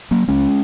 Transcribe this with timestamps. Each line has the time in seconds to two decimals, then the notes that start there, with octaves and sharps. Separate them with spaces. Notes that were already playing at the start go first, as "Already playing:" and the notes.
0.11 F#3 A#3
0.28 C#2 C#3 G#3 C#4